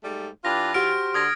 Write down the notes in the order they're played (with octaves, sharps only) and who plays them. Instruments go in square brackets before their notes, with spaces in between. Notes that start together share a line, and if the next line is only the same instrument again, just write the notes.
[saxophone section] G#2 G3 A3
[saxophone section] E3 F4 [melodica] D4 G4 B4 [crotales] A#6
[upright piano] F#4 G4 [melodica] C5 [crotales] F6 D7
[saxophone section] D3 [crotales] D#6 G#6 A#6